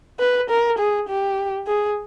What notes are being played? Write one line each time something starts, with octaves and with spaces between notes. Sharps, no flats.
B4
A#4
G#4
G4
G#4